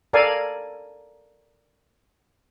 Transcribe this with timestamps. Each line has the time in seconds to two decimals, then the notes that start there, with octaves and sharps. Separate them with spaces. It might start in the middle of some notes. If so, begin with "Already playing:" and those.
0.13 A4 A#4 D5 F5 G#5